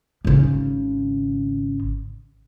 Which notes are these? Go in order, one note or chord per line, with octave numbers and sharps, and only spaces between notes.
G#1 C#3